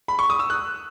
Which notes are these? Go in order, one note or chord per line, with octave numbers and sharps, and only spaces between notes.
B5
C#6
D#6
E6
F#6